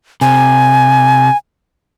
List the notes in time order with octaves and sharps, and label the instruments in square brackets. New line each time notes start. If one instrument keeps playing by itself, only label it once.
[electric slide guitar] C3 [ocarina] G#5